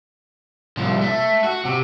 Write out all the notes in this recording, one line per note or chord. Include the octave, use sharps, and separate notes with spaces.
C2 F3
A3
F#4
C3